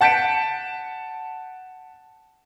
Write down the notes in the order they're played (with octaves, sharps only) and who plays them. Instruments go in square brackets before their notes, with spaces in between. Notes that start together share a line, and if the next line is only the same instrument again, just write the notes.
[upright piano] F#5 A5 G6 B6 C#7 D7